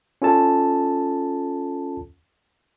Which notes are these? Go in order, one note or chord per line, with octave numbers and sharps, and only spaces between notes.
C#4 F4 A4 A5